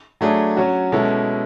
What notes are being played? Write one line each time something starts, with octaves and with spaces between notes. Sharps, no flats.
F#3 A3 D4 G#4
F#3 C#4 F#4
B2 G#3 C#4 E4 A4